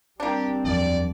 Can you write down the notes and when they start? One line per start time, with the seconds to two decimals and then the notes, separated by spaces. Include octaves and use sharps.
0.20 G3 A#3 C4 D4 G4
0.64 E1 F#2 F3 D5